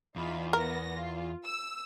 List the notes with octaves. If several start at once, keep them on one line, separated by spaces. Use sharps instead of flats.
E2 D#4 F4 B5
B3 A#4 A#6
F4
E6